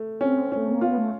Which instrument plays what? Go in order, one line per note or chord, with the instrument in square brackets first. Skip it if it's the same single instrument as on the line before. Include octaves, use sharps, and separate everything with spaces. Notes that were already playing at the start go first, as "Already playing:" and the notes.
Already playing: [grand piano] A3
[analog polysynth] C4 [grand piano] C#4
[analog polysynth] A3 [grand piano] C#4
[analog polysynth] A#3
[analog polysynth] B3 [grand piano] F4
[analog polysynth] A3